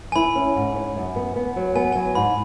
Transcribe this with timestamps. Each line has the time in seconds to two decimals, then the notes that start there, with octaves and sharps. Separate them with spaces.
0.12 G#5
0.16 E4 B5
0.36 C#4
0.56 G#2
0.76 C#4
0.96 F#2
1.16 B3
1.36 B3
1.56 F#3
1.76 B3 G#5
1.93 F#3 G#5
2.15 G#2 B5